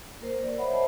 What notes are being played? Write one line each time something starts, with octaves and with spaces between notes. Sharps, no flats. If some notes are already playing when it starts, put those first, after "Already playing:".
A#3 A#4 C5
D5
C5 C#5 D#5 E5 F#5 B5
C5 E5 A5 B5